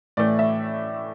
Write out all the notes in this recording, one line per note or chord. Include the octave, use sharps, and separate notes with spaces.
A2 E3 A3 D5
E5